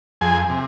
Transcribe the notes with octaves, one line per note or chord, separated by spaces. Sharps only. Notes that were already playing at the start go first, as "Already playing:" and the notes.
F2 G#4 G#5
C3